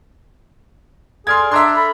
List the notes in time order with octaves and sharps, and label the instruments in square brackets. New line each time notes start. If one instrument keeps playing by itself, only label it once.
[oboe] G#4 [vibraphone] A4 D5 [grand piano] C6 F6 G#6
[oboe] D4 [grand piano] E5 A#5 C6
[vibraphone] A4 [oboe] B5